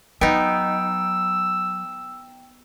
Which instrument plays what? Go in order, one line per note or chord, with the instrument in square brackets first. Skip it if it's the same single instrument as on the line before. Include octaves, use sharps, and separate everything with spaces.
[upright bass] F#3 [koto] B3 D#4 [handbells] G5 [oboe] E6